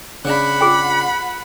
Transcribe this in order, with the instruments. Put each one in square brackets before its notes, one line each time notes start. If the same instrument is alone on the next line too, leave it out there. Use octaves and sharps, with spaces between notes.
[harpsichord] C#3 D4 [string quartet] F#5 B5
[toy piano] F4 G#4 G5